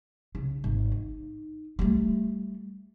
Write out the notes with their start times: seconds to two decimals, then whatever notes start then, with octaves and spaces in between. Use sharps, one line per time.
0.35 C#3
0.64 G#1
0.92 D#4
1.79 G3 A3